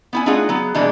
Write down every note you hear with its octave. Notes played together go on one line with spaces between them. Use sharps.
B3 E4 G#5
A3 D4 D#4 F4 G#4 F#5
F#3 B3 G#4
B2 E3 G3 G#3 A#3 D4